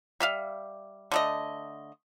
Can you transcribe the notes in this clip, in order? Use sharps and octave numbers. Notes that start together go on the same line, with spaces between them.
G3 E5 F5
D3 A3 D#5